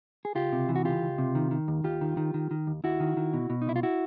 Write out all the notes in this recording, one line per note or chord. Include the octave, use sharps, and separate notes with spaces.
G#4
C#2 F4 G4
C3
E3
F#4
C#2 F4 G4
C#2
C3
D#3
D#3
D#2
D#2 F4 G4
D#3
D#3
D#3
D#3
D#2
D#2 E4 F#4
D#3
D#3
B2
B2
D#4
C2 E4
F4
E4 F#4